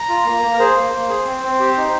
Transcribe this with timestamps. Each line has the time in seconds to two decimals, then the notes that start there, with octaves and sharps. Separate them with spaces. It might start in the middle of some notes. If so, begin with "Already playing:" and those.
Already playing: A#5
0.09 F4
0.25 A#3
0.42 A#3
0.54 A#4
0.59 G#4 C5
0.76 A#3
0.92 A#3
1.09 G#4
1.26 C4
1.43 C4
1.60 G4
1.77 D#4